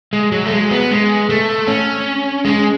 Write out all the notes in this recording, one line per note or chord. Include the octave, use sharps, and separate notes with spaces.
G#3
F#3
A3
G#3
B3
G#3
A3
C#4
G#3